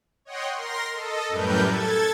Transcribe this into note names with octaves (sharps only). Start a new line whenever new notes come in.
C#5 D#5 F#5 G5 C6
A#4 C6 A#6
A4 D#5
F#2 A2 G3 A#4 B4 G6
A4 G#6 A6